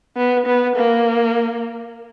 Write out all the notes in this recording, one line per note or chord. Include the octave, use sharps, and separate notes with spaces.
B3
B3
A#3